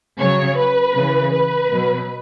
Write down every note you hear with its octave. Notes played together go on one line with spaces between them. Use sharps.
C#3 F#3 C#5
B4
C#3 E3
B4
B2 F#3